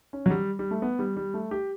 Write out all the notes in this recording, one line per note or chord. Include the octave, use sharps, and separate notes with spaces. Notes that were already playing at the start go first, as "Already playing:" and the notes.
C#4
F#3
G3
G3
A3
B3
G3
G3
A3
G4